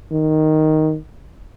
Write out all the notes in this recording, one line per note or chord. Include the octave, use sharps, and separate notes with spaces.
D#3